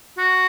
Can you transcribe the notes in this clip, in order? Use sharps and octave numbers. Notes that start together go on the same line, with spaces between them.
F#4